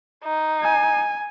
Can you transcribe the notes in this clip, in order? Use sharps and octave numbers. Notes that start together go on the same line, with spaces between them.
D#4
G#5